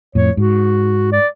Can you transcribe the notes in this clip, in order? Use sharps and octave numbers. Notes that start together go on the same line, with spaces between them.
F2 A2 C#5
G#2 F#4
D5